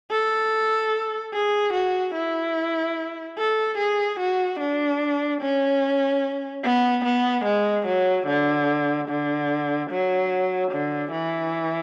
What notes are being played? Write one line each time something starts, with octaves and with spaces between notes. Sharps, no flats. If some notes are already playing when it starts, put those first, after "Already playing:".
A4
G#4
F#4
E4
A4
G#4
F#4
D4
C#4
B3
B3
G#3
F#3
D3
D3
F#3
D3
E3